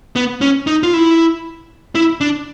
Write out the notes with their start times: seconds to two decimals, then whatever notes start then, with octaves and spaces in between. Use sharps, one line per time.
0.16 B3
0.41 C#4
0.67 D#4
0.83 F4
0.94 E4
1.95 E4
2.21 D4